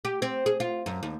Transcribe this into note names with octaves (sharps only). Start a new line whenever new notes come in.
G4
C4
G#4
F4
F#2
D#2